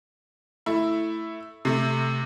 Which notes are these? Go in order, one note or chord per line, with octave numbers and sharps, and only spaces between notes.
A3 E4
C3 A3